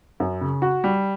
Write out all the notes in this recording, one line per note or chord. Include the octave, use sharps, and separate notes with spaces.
F#2
C#3
F#4
G3